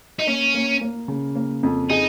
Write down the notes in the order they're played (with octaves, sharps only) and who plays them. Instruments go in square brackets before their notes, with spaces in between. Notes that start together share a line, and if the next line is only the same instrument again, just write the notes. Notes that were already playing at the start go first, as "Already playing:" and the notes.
[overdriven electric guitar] D#4
[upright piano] A#3 [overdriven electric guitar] C#4
[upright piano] A#3
A#3
C#3
A#3
F2
[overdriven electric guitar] D#4 [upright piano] G#4